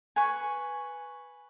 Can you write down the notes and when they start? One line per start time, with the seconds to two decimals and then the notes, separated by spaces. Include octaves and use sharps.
0.16 B4 G#5 C#6